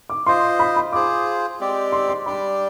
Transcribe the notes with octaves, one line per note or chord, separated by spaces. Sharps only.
D6
F4 C5 D#5 C6
B5
B5
F4 G#4 C5 D6
G#3 C4 G4 D5
C6
C6
G3 D4 G4 D5 B5